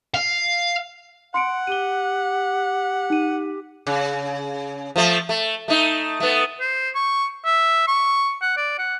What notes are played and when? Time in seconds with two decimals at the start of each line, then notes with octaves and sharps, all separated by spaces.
0.14 F5
1.34 F#5 C6 C#7 D7
1.67 G4 D#7 G7
3.10 D#4 D#7
3.87 C#3
4.96 F3 A3
5.29 A3
5.68 A3 D#4
6.20 A3 B3
6.60 C5
6.95 C#6
7.45 E5
7.88 C#6
8.42 F#5
8.57 D5
8.79 F#5